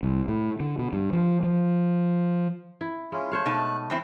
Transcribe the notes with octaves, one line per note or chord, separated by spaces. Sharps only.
C2
A2
D3
B2
G2
F3
F3
E4
G#3 C#4 E4 F4
A3 C5 C#5 F5 F#6
B2 D#4 A5
E2 C4 E4